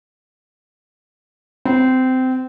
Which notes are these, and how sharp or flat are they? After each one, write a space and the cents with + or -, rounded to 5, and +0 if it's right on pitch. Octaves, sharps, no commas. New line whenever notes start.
C4 -20